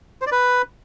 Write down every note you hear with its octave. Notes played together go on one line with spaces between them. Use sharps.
C5
D5
B4